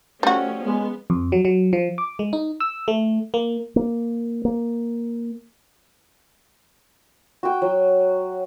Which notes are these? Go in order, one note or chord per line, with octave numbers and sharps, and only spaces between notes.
F3 G3 A3 C#4 F#4
G#3 B3
F2
F#3
F#3
F3
D6
G#3
D#4
E6
A3
A#3
A#3
A#3
F#4 G5
F#3